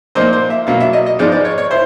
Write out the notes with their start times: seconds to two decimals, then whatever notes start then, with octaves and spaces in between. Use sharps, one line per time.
0.15 A#2 F3 A#3 D#4 C5
0.33 C5
0.50 E5
0.67 B2 F#3 A#3 F5
0.80 E5
0.93 D#5
1.06 D#5
1.19 G#2 F3 G#3 B3 D#4 D5
1.32 D5
1.45 C#5
1.58 C#5
1.71 E4 C5